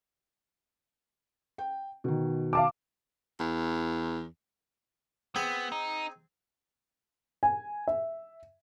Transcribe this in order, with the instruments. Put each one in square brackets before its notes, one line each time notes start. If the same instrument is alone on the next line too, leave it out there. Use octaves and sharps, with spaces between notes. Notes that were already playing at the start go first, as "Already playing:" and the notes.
[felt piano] G5
B2 D#3
[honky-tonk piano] F5 A5 D6
[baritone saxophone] E2
[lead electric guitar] B3 [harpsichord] C4 G#4
[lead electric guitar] D#4
[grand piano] G#5
E5